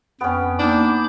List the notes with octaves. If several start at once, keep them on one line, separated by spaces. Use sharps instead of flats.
F2 B3 C#4 G5
A#3 D4 D#4 B5 D6 G6